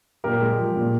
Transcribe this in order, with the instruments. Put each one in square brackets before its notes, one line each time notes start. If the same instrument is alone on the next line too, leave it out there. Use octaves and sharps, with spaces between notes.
[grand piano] A#2 G4 A#4
G#3
F3
A#2